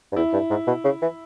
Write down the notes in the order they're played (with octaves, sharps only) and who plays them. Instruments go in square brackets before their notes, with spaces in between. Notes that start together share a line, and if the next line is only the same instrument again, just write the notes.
[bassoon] G2
[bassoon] E2 [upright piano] E4
[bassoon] G2
G#2
B2
C#3
E3